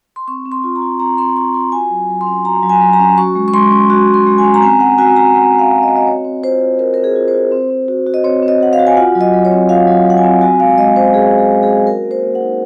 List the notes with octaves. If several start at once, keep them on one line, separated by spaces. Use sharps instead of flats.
C6
C4 C#6
C4
C6
F4
A#5
F4
C4 A#5
C4 C6
F4 C#6
F4 C6
F#4 G#5
F#3
F#3
C6
C#4
F#4 A#5
F#3
G#5
F#3
A#5
C#4
F#4 C#6
G#3
C#6
G#3 C6
C#4
F#4 C#6
G#3
C6
G#3
G#5
C#4
A#5
C4 G#5
C4 F#5
F#4 G#5
F#4 A#5
C4 F#5
C4
F5
F#4
D#5
F#4
D#5
C4 C#5
C4
F4 C5
F4
C4 A#4
C4 A#4
G#4
F4
C5
F4
C4
C4
F#4
F#4
D#5
C4 C#5
C4
D#5
F#4 F#5
F5
F#4
G#5
F4 F#5
F#3
D#5
F#3
C#5
C4
F4 F5
F#3
F#3 F#5
G#5
C4
F#4 G#5
G#3 F5
G#3 D#5
C#4 C5
F#4 G#4
G#3
G#4
G#3
G#4
C#4
F#4 A#4
A#3
C5
A#3
F#5
D#4